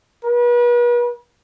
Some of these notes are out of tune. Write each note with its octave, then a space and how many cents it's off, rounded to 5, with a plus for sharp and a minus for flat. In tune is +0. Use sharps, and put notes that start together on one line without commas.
B4 -40